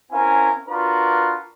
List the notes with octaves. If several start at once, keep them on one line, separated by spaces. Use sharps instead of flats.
C4 C#4 E4 A#4 F5 G#5
D4 F4 F#4 A#4 B4 B5